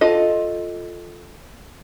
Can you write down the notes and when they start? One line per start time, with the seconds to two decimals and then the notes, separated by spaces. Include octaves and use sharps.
0.01 F4 A4 D#5